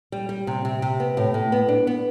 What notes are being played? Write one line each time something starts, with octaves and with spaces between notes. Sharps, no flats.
G3
G3
C3
C3
C3
B3
A2
A2
B3
D4
B3